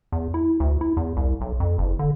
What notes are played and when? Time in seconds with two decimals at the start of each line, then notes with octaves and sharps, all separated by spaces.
0.12 E2
0.34 E4
0.60 D2
0.81 E4
0.97 E2
1.17 C2
1.41 B1
1.60 F2
1.78 F#1
1.99 D3